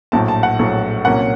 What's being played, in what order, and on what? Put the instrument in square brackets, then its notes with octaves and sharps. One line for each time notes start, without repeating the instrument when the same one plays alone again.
[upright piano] A#1 A2 F#3 A5
A5
F#5
A#1 A2 F#3
C2 A#2 F#3 A#3 C#4 F#5